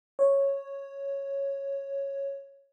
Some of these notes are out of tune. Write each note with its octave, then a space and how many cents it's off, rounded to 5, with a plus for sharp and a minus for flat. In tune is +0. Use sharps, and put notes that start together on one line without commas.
C#5 -5